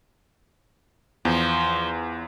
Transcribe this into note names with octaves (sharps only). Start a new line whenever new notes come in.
E2 F3